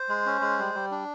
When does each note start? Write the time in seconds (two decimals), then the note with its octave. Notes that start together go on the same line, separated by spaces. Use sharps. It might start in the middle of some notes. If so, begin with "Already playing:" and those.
Already playing: C5
0.09 G#3
0.26 C#4
0.41 G#3
0.59 G3
0.75 G3
0.91 D4